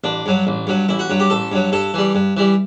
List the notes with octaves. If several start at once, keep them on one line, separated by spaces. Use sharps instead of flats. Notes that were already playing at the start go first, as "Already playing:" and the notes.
A1 D4
G2 F#3
A1
G2 F#3
A1 E4
F#4
G2 F#3
G4
A1 A4
G2 F#3
G2 A4
E3 G3
G2
E3 G3